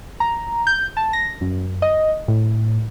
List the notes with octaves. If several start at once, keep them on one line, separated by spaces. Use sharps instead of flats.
A#5
G6
A5
A#6
F#2
D#5
A2